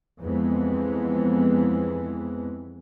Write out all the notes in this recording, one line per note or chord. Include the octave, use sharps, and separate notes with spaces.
F2 E3 G#3 B3